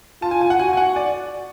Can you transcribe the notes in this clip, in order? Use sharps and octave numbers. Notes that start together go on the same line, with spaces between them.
F4 A5
G#5
G#5
F#5
F#4 G#5
G#5
F#5
D5